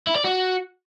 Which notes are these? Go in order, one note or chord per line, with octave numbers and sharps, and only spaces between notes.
E4
D5
F#4